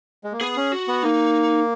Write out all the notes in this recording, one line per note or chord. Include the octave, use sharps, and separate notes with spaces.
G#3
A#3
B3 G#4
C#4
F#4
B3
A#3 D#4